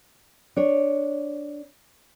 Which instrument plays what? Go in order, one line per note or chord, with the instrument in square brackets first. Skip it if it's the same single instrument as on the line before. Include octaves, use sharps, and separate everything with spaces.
[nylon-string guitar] D4 C#5